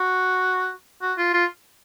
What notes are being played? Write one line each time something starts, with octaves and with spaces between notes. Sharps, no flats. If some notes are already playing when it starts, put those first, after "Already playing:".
Already playing: F#4
F#4
F4
F4